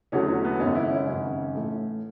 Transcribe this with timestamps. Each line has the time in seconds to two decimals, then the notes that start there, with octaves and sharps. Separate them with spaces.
0.12 E2 D3 F#3 A3 C#4
0.28 C#4
0.44 B3
0.60 G#1 F#2 C#3 C#4
0.75 E4
0.91 C#4
1.07 G#1 F#2 C#3
1.55 A2 E3 A3